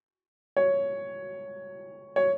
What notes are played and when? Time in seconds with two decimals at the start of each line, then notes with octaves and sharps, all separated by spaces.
0.57 C#5
2.16 C#5